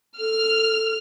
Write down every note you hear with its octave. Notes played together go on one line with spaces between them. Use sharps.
A4 F6